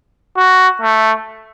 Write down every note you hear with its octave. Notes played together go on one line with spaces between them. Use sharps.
F#4
A3